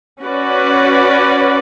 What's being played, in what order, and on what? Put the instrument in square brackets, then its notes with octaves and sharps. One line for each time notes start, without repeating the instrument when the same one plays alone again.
[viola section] C#4 F#4 B4 D5